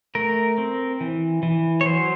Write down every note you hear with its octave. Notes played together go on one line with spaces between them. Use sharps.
A3 A#4
C4
E3
E3
C#5
F#3 C5